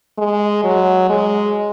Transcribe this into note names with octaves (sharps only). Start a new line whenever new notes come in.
G#3
F#3
G#3